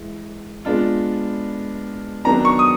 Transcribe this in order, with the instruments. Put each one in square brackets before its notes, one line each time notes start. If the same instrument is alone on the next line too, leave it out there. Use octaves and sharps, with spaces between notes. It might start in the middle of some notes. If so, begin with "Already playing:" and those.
Already playing: [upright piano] E3 G#3
G#3 B3 D4 F4
[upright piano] D#3 F#3 B3 D4 [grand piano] A#5
[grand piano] C#6
D#6